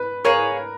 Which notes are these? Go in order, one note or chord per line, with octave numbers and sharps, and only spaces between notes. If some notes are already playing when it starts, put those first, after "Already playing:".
Already playing: B4
G#4 A#4 C#5 F5